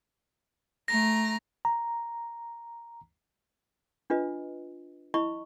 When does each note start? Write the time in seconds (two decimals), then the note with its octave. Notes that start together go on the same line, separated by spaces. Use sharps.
0.88 A3 A#5 A#6
1.65 A#5
4.10 D4 F4 B4 D#5
5.14 E4 D#5 B5 C#6